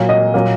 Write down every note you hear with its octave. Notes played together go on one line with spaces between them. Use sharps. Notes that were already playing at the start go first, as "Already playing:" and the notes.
Already playing: A#2 F#3 A#3
D#5
A#2 F#3 A#3